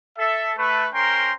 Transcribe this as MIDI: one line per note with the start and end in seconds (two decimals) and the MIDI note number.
0.18 0.51 69
0.18 0.51 76
0.58 0.87 57
0.58 0.87 71
0.93 1.32 61
0.93 1.32 70
0.93 1.32 72
0.93 1.32 79
0.93 1.32 82
0.93 1.32 84